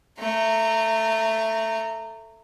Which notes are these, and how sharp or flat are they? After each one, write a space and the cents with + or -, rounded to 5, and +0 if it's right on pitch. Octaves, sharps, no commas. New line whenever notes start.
A3 +10 A#5 -20